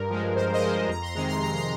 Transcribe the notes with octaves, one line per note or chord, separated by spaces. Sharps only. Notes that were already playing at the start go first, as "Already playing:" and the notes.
Already playing: G2 A#4
F3 G#3
G2 C5
C5 D#5
F3 G#3
F2 A#5
C6
C3 D#3 G#3 A#5
C6
F2 A#5
C6